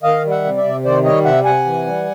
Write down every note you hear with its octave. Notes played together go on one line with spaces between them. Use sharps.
D#3 D#5 F5
G3
E5 F#5
C3
D5 E5
C3
D#3 C5 D5
G3 C#5 D#5
C3 E5 F#5
C3 F#5 G#5
E3
G3